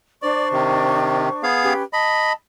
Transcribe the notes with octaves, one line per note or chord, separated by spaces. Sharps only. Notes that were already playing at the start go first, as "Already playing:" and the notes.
D4 C5 D5 C#6
C3 D#3
B3 G#4 F5
C#4 G4 B4
D#5 A5 B5